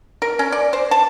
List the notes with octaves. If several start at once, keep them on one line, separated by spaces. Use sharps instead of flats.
A#4
C#4
D5
C5
A5